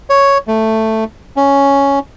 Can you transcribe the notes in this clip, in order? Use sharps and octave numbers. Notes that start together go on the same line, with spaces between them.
C#5
A3
C#4